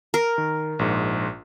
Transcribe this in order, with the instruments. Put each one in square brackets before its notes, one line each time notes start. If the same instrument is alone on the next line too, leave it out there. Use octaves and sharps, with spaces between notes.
[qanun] A#4
[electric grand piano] D#3
A#1 G#2